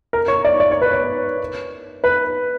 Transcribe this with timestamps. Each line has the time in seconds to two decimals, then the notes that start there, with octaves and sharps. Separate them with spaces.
0.13 A#4
0.28 C#5
0.45 D5
0.60 D5
0.71 C#5
0.82 B4
0.92 C#5
2.04 B4